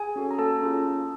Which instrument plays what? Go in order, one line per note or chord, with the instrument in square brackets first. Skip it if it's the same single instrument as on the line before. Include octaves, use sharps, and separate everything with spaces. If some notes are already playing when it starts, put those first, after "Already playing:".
Already playing: [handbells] G#4 G#5
C#4 F#4 A4
A#5
A#3 A4 A5
C#4 F4 G#4
A#3